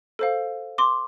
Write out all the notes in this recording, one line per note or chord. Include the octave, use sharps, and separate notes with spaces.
A4 C5 F5
C6 D6